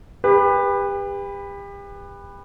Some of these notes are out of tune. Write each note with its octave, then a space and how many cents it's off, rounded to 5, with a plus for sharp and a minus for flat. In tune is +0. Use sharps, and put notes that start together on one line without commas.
G4 +35 B4 +0